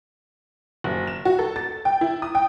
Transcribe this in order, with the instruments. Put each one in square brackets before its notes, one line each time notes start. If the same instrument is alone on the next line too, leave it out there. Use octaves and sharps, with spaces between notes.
[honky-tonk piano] F#1
E7
F#4
A4
A6
G5
E4
D#6
G5